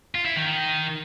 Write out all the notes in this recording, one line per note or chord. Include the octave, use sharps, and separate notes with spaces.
F4
E4
D#3
D#3